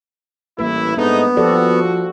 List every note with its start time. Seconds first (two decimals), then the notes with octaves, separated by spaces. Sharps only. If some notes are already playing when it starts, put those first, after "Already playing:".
0.59 A1 E3 G3 A#3 E4 B4
0.97 G#2 A3 B3 D4 D#4
1.37 F3 F#4 G4 A4 D5